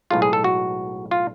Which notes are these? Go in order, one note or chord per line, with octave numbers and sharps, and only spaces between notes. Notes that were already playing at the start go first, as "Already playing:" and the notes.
B1 A2 G#3 F4
G#4
A4
F#4
F4